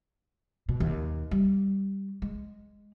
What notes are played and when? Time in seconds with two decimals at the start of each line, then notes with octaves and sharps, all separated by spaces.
0.69 B2
0.80 D#2
1.31 G3
2.22 G#3